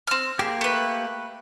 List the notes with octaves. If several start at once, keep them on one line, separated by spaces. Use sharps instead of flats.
C4 F6
A#3 G4 G#4
A3 B4